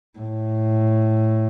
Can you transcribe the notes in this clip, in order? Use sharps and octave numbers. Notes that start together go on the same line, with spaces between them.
A2